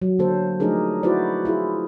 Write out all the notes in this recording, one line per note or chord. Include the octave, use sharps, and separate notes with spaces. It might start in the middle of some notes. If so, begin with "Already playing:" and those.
F#3
D3 A#3 A4 C5
F3 A3 D4 D#4 G#4 A#4
E4 F#4 B4 C5 D5
E4 F4 G#4